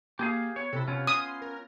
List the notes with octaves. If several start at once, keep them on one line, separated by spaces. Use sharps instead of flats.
A#3 G4 G#4 F5
B3 C#5
C3 E4 A4
C3 B3 C#4 F4
C6 D#6
A#4